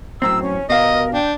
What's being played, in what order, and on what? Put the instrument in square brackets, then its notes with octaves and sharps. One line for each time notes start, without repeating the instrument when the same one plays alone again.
[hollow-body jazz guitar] F#2 A2 C4 [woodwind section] G5 A#5 E6
[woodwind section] C#4
[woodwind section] G2 A#4 [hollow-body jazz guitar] B2 F5 [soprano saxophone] D#5
[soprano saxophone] D4 [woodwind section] G5